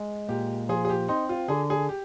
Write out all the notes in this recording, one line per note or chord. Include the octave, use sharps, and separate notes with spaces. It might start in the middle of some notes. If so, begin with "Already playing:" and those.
Already playing: G#3
A#2 G4
F3 G#4
G#4
G4
C4 D#4
F4
D3 G#4
G#4
G4